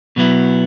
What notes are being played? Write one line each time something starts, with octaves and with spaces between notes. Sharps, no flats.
B2 F#3 B3 E4